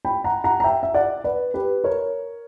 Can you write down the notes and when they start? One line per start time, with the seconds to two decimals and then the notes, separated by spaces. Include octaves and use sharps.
0.05 G5 B5
0.24 F#5 A#5
0.44 F#5 A#5
0.60 A#5
0.64 E5 G5
0.83 E5
0.94 D5 F#5
1.24 B4 D5
1.54 G4 B4
1.84 A#4 C#5